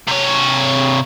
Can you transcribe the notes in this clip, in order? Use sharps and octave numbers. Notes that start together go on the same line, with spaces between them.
C3 C#5